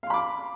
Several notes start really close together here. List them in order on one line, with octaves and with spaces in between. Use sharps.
F5 C6 B5 D6